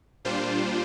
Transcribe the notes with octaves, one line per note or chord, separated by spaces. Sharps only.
A#2 G3 D4 F4 C5